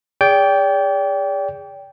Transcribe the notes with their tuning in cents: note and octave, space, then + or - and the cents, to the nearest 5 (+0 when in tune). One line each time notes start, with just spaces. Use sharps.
G#4 -25 D5 -35 G5 +0